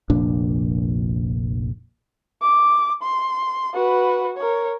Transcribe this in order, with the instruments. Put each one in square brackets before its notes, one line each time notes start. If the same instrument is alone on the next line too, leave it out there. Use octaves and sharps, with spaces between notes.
[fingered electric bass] F1 A#1 A#2 D4
[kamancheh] D6
C6
F#4 B4
A#4 C#5